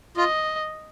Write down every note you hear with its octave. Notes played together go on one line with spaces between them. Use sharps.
F4 D#5